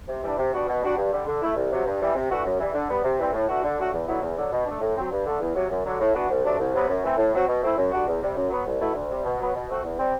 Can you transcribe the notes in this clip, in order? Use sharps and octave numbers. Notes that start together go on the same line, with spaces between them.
C3
E3 G3 D4
C3
G3 B3 D4 F#4
B2
G3 D4 F#4
G2
D3 G3
D3
A3 E4
C2
C3 F#3
G2
E3 G3
C3
E3 A3 D4 F#4
F#2
E3 G3
D3
G3 B3
C3
E3 G3 C4
A2
E3 A3 D4 F#4
D3
F#3 A3 D4 F#4
E2
D3 F#3 B3 E4
E2
D3 F#3
B2
A3 D4
A2
F#3 C4
G2
D3 A3
E2
C3 F#3
F#2
D3 F#3
A2
E3 B3 D4 F#4
C2
C3 F#3 A3 D4
C2
C3 F#3 B3
F#2
E3 A3 C4
A2
F#3 C4 F#4
B2
A3 C4 E4
F#2
D3 G3 D4 F#4
E2
C3 G3
F#2
F#3 B3
C2
B2 A3 E4
D2
C3 G3
B2
F#3 B3
B2
A3 C4 F#4
E2
C3 G3 C4